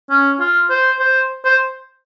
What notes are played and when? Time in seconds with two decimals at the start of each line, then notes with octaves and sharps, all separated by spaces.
0.10 C#4
0.40 F4
0.70 C5
0.99 C5
1.45 C5